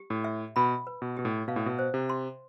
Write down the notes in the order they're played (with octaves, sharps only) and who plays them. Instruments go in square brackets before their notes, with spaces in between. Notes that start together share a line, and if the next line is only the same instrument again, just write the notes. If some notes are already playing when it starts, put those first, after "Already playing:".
Already playing: [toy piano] G4
[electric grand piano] A2
[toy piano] E5
[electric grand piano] B2 [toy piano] B5
[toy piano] B4
[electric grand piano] B2
[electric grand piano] B2 [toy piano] G4
[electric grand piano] A2
[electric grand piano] B2 [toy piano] F5
[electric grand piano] A2
B2
[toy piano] C5
[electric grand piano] C3
[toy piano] C6